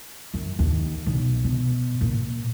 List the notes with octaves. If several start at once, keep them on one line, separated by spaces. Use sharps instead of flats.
F#2
D#2
B1
B2
A#2